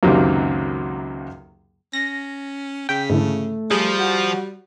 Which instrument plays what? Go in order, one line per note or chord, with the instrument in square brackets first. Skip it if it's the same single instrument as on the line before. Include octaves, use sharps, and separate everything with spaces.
[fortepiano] C#2 F#2 C3 D#3 F#3 A#3
[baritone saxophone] C#4 [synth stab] A#6
[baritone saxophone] C#3 [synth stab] G5 [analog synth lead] B6
[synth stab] G#2 D3 E3 [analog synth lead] A3
[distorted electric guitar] F3 [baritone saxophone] G3 [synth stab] G#4
[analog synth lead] F#4